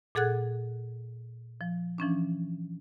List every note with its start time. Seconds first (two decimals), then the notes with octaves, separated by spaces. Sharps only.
0.15 A#2 G#4 A4 F#5 F#6 G#6
1.61 F3
1.98 E3 F3 C#4 D4